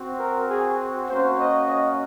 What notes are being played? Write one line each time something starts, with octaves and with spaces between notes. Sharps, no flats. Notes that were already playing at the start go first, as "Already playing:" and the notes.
Already playing: C4 F#4
A#4
G#4
A#3 C#4 F#4 C5
D#5
D#5